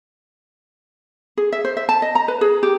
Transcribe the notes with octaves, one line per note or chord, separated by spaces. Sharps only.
G#4
E5
C5
E5
A5
D#5
A#5
B4
G#4
G4